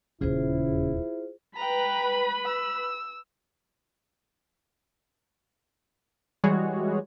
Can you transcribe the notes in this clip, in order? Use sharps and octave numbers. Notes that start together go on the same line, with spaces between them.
D#1 E2 C#3 E4 F4 G#4 C5
B4 G5 A#5 B5
E6
E3 G3 G#3 F#4 G#4 C#5